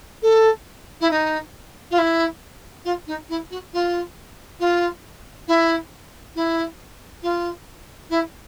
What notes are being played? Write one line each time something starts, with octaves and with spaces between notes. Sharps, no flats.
A4
E4
D#4
F4
E4
F4
D#4
E4
F#4
F4
F4
E4
E4
F4
E4